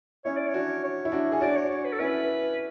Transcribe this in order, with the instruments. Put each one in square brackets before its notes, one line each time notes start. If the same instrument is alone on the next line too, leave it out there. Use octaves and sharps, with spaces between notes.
[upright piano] C#4 E4 [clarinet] C#5
[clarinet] D5
C#5
[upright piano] D4 F#4
[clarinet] C#5
[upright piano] E4
D4 F#4
G#4
[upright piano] D4 F#4 [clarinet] D5
[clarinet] C#5
C#5
B4
A4
[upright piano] C#4 E4 [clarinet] B4